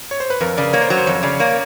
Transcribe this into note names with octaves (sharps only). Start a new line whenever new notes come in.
C#5
C5
B4
F2 A#4
C#3 D5
A#3 C#5
C5
F#3
C5
F2 C#5
C#3 D5
A#3 C#5